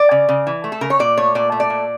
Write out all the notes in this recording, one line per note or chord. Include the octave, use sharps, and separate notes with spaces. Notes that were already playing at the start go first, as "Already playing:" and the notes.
Already playing: D5
C#3
C#3
E3
A3
A4
C#3 A#4
C#5
A#2 D5
A3 C#5
A#2 D5
A3
D5
A#2